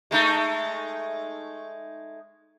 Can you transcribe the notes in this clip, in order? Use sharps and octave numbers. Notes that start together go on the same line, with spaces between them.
G#3 A3 D#4